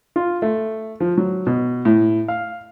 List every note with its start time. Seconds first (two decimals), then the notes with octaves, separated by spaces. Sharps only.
0.16 F4
0.42 A3
1.00 F3
1.18 F#3
1.47 B2
1.85 A2
2.28 F5